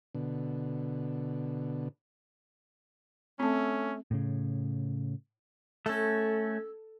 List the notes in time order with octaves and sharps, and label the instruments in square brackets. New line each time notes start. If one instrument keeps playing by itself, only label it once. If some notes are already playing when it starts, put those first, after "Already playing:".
[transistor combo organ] B2 D3
[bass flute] A3 [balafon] C4 A5 [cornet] C#4
[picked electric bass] A2 C#3
[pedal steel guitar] A3 C#4 [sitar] A4